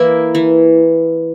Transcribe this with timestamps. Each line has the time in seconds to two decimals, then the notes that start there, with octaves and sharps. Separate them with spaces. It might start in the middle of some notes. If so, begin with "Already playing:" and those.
Already playing: E3 A#3 E4
0.35 E3